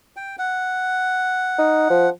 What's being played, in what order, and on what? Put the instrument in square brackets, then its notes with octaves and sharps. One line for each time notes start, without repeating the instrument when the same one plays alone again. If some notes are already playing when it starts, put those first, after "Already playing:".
[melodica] G5
F#5
[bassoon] D#4
F3